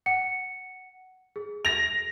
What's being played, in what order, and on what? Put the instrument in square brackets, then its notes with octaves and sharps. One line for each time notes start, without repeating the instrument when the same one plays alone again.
[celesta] F#5 C#7
G#4
[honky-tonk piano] A#6 F7